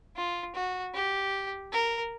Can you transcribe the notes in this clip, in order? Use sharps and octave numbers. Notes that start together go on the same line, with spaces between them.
F4
F#4
G4
A#4